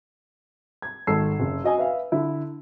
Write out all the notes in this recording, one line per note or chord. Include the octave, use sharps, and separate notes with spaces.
G#6
G#1 A4 E6 C7
F#1
F#4 D#5 G#5
B4 E5 F5
D3 E4